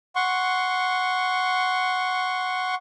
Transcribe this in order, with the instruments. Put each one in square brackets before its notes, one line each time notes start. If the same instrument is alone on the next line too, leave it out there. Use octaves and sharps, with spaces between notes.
[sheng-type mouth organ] F#5 C6 C#6